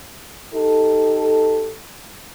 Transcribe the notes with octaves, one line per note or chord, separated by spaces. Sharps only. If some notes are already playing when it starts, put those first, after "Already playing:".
D#4 G4 A4